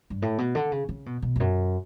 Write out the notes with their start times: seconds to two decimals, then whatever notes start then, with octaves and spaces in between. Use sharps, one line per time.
0.10 G2
0.22 A2
0.38 B2
0.55 D3
0.72 C#3
0.89 C#3
1.06 B2
1.22 B2
1.36 E2
1.40 F#2